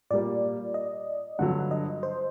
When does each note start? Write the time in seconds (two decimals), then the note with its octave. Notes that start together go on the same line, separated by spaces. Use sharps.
0.10 A#2 G3 A#3 D5
0.74 D#5
1.39 G2 D3 F#3 F#5
1.71 D#5
2.03 C5